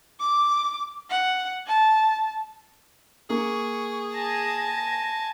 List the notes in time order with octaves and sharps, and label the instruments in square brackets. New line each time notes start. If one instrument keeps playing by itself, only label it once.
[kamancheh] D6
F#5
A5
[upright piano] A#3 [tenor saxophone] G#4 [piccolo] C#6
[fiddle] G#5 A5 [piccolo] A#6